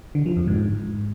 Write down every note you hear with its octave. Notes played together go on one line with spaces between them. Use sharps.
D3
F3
F2
G#2